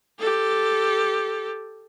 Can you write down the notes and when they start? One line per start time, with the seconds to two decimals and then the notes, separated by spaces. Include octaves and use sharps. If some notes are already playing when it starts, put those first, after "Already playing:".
0.19 G4 A4